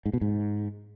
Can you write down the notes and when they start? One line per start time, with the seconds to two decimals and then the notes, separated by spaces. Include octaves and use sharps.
0.06 G#2
0.13 B2
0.21 G#2